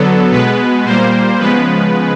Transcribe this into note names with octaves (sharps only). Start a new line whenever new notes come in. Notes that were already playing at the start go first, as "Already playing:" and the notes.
Already playing: D3 F#3 B3 A4
B2 G#3 B3 B4
A#2 G3 A#3 C5
C#3 F3 G#3 B3 B4